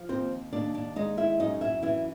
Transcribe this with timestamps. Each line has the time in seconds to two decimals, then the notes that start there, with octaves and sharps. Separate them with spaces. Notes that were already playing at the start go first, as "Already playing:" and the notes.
Already playing: F3
0.09 D#2 C4 C5
0.52 D#2 D4 D5
0.74 D4 D5
0.96 G#3 D#4 D#5
1.17 E4 E5
1.39 F#2 D#4 D#5
1.61 E4 E5
1.83 E3 E4 E5